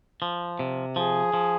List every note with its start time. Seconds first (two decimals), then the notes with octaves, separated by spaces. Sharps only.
0.22 F3
0.59 C3
0.96 F3 G#4
1.34 F3